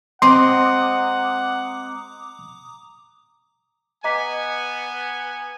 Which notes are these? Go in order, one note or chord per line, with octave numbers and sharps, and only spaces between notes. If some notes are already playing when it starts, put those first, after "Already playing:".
G#3 C4 D#5 F#5 A#5 C6 D6 D#6
B3 D#5 G#5 A#5 D6 B6